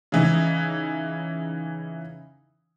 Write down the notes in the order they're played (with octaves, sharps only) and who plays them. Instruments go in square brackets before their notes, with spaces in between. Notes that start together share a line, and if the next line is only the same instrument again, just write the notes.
[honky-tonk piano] C#3 E3 D#4